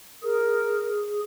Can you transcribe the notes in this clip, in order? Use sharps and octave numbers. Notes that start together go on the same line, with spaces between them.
G#4 A#4